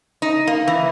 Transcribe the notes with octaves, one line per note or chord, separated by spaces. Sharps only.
D#4
A#3
E3